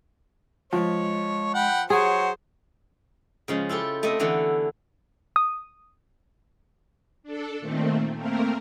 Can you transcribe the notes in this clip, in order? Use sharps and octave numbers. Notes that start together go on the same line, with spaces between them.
F3 G#3 C#5
F#5 G5 B5
F#3 G#4 C5 C#5 F#5
C#3 F3 G#3
E4 F4 G4 A4
A3 C4 D#5
D3 E3 A3 B3
D#6
D4 A4
A#2 D#3 A3 C4
A3 A#3 C4 A#4